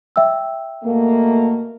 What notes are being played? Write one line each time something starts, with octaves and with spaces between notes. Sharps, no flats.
E5 G5 E6
B2 A3 A#3